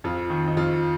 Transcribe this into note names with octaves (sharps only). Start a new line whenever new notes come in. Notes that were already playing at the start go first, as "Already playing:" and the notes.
F2 F4
D#3
D#4
F2 F4